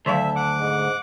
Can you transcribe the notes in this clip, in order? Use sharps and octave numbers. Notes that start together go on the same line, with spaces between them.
D2 D#3 F#3 A4 E5 F5
F#5 D6
G#2